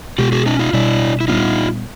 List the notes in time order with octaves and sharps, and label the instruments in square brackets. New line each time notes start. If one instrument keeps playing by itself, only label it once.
[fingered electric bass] B2 G#3 B3 [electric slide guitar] F4 G4
[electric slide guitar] F#4 G#4
C#4 D#4
D#4 F4
[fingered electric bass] B2 G3 B3 [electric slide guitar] D4 E4
[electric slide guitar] E4
[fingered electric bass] A#2 G3 B3 D4 [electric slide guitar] D#4 F4